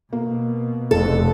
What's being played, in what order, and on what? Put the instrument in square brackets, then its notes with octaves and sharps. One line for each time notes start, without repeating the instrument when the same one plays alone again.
[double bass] B2 [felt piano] A#3
[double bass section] F1 F2 [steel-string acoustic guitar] A4